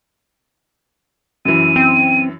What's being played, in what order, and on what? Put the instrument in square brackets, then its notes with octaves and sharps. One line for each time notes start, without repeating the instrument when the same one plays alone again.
[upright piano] F#2 E3 [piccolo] D#7
[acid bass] C4